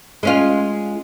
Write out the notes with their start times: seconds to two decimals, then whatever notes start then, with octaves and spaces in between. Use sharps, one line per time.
0.23 G#3 C#4 F4